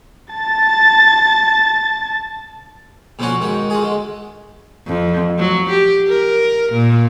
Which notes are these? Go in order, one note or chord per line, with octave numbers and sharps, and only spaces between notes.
A5 A6
B2 D3 F3 B3 C#4 F#4
G#2 D#3 F#4
F4 F#4 G#4
D3 G#3
F2
F#3
G4
A#4
A#2